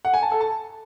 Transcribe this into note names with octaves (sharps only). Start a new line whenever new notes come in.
F#5
G#5
A5
A4
A5